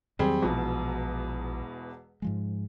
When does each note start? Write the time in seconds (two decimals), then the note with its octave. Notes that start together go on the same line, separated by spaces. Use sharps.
0.19 E2 D#3 F#3 G3 C4 G#4
0.42 E1 A#1 E2 B2 F3
2.22 G#2 F3 G#3